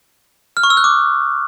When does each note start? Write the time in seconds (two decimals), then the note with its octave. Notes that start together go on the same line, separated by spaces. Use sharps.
0.57 F6
0.63 C#6
0.70 E6
0.77 F#6
0.84 D6